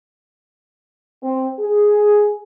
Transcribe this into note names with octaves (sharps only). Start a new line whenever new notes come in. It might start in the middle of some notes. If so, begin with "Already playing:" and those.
C4
G#4